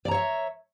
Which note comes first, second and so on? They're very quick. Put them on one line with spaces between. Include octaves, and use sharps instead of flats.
D5 A#5 C#5 E5